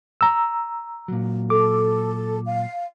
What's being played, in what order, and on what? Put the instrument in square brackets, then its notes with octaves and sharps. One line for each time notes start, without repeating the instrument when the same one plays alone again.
[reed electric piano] A#5 E6
[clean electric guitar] A#2 F#3
[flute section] A4 [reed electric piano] D6
[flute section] F5